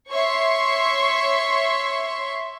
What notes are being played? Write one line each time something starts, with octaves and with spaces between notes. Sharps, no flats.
C#5 E5 C6 C#6